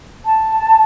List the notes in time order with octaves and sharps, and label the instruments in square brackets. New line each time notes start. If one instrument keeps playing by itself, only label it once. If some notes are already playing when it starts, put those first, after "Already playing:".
[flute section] A5